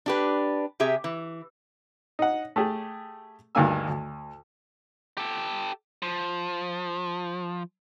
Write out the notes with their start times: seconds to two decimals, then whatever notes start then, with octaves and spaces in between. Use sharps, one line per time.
0.06 D4 G4 B4
0.80 C3 G4 G#4 E5
1.04 E3
2.19 D#4 F#5
2.56 A3 G4 G#4
3.55 D2 G2 D#3 A#3 G#5 E6
3.88 D2
5.18 G4 A4
6.03 F3